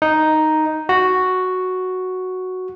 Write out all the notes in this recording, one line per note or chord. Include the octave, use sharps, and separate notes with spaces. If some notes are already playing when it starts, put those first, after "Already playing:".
D#4
F#4